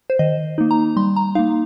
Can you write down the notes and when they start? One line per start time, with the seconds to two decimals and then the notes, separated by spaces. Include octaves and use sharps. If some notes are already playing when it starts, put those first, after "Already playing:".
0.10 C5
0.19 D#3 D#5
0.58 A#3 D#4
0.71 A#5
0.96 G3 C6
1.16 A#5
1.35 A#3 D#4 F5